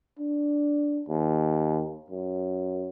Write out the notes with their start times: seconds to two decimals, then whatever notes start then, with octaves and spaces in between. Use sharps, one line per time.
0.19 D4
1.09 D#2
2.10 F#2